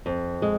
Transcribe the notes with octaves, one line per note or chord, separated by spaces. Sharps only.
F2
G#3